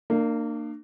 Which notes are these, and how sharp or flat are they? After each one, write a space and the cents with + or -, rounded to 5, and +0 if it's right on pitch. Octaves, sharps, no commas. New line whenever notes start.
A#3 -20 D4 +40